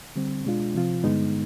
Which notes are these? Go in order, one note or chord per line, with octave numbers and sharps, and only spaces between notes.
D3 G3 C4
B2 G#3 D4 F4
C3 F3 C4 F4
G2 D3 G#3 B3 D#4